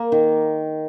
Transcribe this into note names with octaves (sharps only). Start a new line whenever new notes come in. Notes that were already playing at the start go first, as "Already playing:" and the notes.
Already playing: A#3
D#3